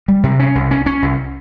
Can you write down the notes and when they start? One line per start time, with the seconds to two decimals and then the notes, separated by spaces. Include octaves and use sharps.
0.08 G3
0.23 C3
0.40 C#4
0.55 C2
0.71 C#4
0.86 C#4
1.02 C2